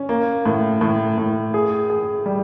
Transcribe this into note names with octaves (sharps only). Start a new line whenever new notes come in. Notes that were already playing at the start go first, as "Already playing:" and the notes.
Already playing: C#4
A#3
A2
A2
A2
G#4
G#4
G3